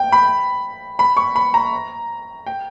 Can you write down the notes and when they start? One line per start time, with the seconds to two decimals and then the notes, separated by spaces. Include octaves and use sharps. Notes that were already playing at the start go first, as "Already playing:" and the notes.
Already playing: G5
0.12 B5
0.99 B5
1.17 C#6
1.36 B5
1.54 A#5
2.46 G5